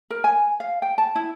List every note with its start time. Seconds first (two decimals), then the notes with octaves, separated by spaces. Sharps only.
0.10 A#4
0.24 G#5
0.60 F5
0.82 G5
0.98 A5
1.15 E4